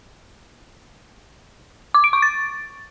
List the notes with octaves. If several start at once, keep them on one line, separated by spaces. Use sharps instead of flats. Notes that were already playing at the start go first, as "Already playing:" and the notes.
D6
D7
C#6
A6